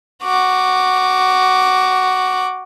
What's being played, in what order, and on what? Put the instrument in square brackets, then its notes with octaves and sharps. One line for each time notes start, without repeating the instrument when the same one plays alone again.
[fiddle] F#4 D6